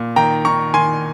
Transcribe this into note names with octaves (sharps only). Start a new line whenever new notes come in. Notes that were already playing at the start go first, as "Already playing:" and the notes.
Already playing: A#2
D#3 G5 A#5
D#3 A#5 C#6
D#3 G#5 C6